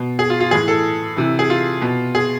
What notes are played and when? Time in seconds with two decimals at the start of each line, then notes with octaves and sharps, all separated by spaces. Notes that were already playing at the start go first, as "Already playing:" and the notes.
Already playing: B2
0.19 G#4
0.30 F4
0.40 F4
0.51 A2 E3 G#4
0.68 A4
1.17 C3 E3
1.39 G#4
1.50 F4
1.82 B2
2.15 G#4